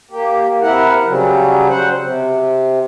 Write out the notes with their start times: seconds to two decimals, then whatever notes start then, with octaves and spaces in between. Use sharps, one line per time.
0.11 A#3 G4
0.62 C3 E4 A#4 F#5
1.06 C#3 F#3 G3
1.69 C5 F#5
2.02 C3